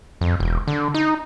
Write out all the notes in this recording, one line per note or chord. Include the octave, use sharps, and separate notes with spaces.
F2
E1
D3
D#4